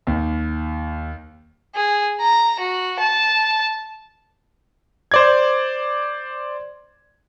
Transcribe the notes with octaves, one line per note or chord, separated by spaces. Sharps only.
D#2
G#4
A#5
F#4
A5
C5 D5 G#6